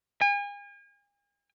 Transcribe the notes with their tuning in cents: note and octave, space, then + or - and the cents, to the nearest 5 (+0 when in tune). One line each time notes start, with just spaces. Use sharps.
G#5 -40